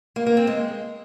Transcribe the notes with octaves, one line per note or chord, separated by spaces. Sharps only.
A#3
A#3
C4
G#3